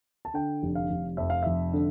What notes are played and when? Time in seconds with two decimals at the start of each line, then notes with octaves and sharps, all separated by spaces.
0.25 A5
0.34 D3 G5
0.63 F1
0.75 F5
0.90 F1
1.17 F2 E5
1.30 F5
1.43 F1 E5
1.73 D3